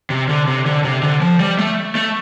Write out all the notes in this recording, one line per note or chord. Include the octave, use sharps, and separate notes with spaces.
C3
D3
C3
D3
C3
D3
F3
G3
A3
A3